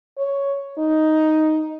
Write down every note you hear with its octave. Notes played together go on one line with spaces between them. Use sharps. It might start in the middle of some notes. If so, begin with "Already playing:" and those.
C#5
D#4